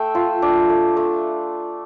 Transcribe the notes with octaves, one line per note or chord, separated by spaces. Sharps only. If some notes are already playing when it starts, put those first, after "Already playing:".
Already playing: A3 E5 G5
F4
D4
A3
A3